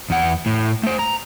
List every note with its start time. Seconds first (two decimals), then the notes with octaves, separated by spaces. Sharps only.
0.10 E2 F#5
0.46 A2
0.83 A3 C5
0.99 A#5